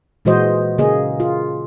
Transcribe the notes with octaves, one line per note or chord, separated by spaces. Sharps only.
A#2 E3 G#3 F#4 C5 D#5
C#3 A#3 G#4 D#5
F4